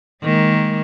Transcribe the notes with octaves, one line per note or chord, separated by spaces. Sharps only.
D#3 G#3 A#3